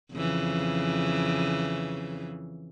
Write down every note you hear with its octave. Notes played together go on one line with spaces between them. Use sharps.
F2 C#3 E3